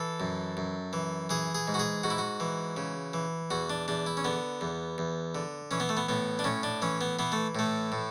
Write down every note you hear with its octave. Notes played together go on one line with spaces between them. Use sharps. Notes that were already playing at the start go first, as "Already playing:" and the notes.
Already playing: E3 A4
F#2
F#2
E3
E3 G#4
G#4
G#2
F#4
G#4
G#2 F#4
E4
F#4
E3
C#3
E3
E2 F#4
D4
E2 D4
E4
C#4
D3 B3
E2
E2
D3
E3 C#4
B3
A3
B3
A2 B3
D4
A2 C#4
D4
E3 C#4
B3
E3 B3
A3
A2 A3
A2